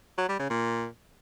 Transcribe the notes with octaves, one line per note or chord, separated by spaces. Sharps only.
F#3
G3
C#3
A#2